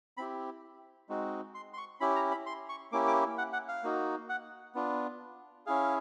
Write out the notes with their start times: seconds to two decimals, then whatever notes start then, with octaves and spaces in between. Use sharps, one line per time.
0.17 C4 E4 G4 B5
1.09 G#3 C4 D#4 F#4
1.55 C6
1.73 C6
1.78 C#6
2.00 C#4 E4 G4 B5
2.16 A#5
2.31 B5
2.46 C6
2.69 C#6
2.92 A#3 C#4 E4 G4 D6
3.07 D6
3.38 F#5
3.53 F#5
3.69 F5
3.83 A#3 D#4 F#4
4.29 F#5
4.75 B3 D4 F4
5.66 C#4 E4 G#4 F5